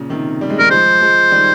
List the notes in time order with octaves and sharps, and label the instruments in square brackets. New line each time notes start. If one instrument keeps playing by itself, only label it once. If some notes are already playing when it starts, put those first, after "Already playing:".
Already playing: [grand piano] A#2 C#3
C3 D#3
G3
G#3
[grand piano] D#3 G3 [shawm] A#4
[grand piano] F3 G#3 [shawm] C5
[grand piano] F3 G#3
D#3 G3